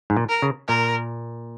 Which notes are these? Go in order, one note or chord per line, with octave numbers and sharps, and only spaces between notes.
G#2
A#2
A#4
C#3
A#2 A#4